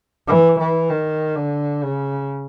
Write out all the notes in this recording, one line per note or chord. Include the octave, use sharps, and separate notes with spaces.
E3
E3
D#3
D3
C#3